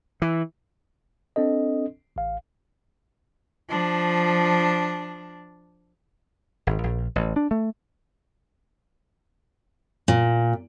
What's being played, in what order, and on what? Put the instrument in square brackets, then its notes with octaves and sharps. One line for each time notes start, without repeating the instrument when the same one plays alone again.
[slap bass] E3
[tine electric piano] C4 D4 A4 D#5
A1 F5
[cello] F3 D4
[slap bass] G#1
A#1
A1
D4
A3
[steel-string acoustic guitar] A#2